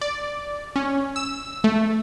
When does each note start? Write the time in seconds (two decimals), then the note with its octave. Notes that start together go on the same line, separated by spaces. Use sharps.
0.01 D5
0.76 C#4
1.16 E6
1.64 A3